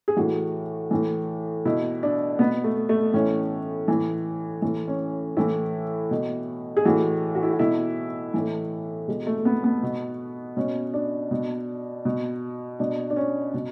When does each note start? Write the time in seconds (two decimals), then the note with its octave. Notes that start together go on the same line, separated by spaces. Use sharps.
0.08 G#4
0.17 A2 E3 F#4
0.91 A2 E3
1.65 B2 E4
2.03 D4
2.39 B2 B3
2.64 A3
2.89 A3
3.14 A2 E3 C#4
3.88 A2 E3
4.62 A2 E3
4.87 C#4
5.37 A2 E3 E4
6.11 B2
6.77 G#4
6.85 A2 E3 F#4
7.35 F#4
7.43 E4
7.51 F#4
7.59 B2 E4
8.34 A2 E3
9.08 B2 G#3
9.27 A3
9.45 B3
9.64 B3
9.83 B2
10.57 B2 C#4
10.94 D4
11.31 B2
12.05 B2
12.79 B2 D4
13.10 D4
13.16 C#4
13.54 B2